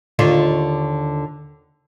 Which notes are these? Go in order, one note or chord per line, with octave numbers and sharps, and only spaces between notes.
D#2 D3 F4